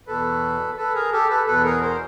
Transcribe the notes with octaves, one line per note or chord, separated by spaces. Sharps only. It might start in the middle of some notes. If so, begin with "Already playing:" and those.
E2 B2 A4 B4
A4 B4
G#4 A#4
G4 A4
A4 B4
E2 B2 A4 B4
G#4 A#4
A#4 C5